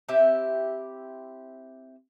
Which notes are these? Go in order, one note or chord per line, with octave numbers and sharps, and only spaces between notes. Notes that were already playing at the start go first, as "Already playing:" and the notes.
C4 E4 G4 E5